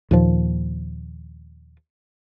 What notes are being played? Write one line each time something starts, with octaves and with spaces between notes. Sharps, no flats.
D#2 A#2 F3